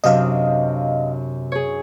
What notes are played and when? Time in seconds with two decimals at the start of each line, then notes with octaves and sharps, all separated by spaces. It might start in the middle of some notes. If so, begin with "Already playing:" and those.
0.04 F#2 C3 D4 D#5 F5
1.52 G#4 C#5